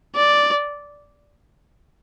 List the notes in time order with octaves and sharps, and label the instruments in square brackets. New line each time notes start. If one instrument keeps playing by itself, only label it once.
[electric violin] D5